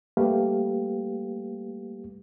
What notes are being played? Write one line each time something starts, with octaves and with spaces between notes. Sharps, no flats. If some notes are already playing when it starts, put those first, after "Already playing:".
G3 A3 A#3 G4 B4 F5